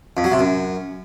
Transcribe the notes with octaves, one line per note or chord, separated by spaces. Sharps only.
F2
F#3
C3
F#2